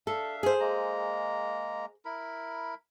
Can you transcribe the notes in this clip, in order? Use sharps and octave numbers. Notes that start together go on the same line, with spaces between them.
D4 A4 E5 F5
G#4 C5
G#3 A#3 A#5
E4 A#4 B5